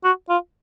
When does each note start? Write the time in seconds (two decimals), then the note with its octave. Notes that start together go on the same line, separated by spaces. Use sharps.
0.04 F#4
0.29 F4